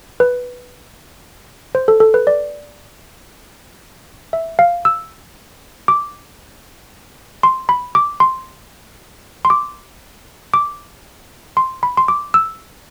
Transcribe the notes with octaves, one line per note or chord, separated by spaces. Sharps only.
B4
C5
A4
A4
B4
D5
E5
F5
E6
D6
C6
B5
D6
C6
C6
D6
D6
C6
B5
C6
D6
E6